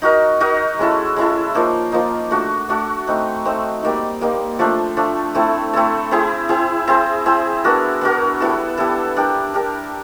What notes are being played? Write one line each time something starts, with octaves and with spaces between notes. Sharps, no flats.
D#4 F#4 A#4 D#5
D#4 F#4 A#4 D#5
G#3 C#4 E4 A4
G#3 C#4 E4 A4
F3 A#3 D#4
F3 A#3 D#4
A3 D4 F#4
A3 D4 F#4
A3 C4 D#4
A3 C4 D#4
G3 A#3 D#4
G3 A#3 D#4
F3 A3 D4
F3 A3 D4
A3 C4 E4 A4
A3 C4 E4 A4
C4 E4 G#4
C4 E4 G#4
C4 E4 G#4 C5
C4 E4 G#4 C5
B3 D4 F#4 A#4
B3 D4 F#4 A#4
G3 B3 E4 A4
G3 B3 E4 A4
D4 G4 A#4
D4 G4 A#4